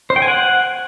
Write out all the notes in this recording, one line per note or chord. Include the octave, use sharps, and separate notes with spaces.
C5
G5
G#5
F#5